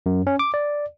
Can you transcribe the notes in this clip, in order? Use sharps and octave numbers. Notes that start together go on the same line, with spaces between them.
F#2
C#4
D6
D5